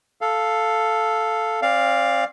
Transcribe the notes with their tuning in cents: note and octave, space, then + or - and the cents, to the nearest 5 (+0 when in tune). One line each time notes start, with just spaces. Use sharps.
A4 +0 F5 +0
C4 +40 D5 +0 F5 +0